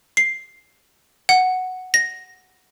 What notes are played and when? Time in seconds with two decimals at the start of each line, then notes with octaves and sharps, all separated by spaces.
0.17 C7
1.29 F#5
1.94 A#6